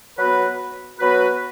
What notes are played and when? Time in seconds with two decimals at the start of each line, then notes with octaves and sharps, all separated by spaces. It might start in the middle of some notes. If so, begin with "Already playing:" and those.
0.18 F#3 B3 F#4 B4
0.99 F#3 B3 F#4 B4